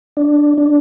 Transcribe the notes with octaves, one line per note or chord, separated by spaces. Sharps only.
D4
D4